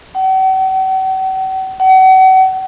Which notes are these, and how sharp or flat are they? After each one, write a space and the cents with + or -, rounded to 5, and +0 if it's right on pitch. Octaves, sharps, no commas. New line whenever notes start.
F#5 +45
F#5 +35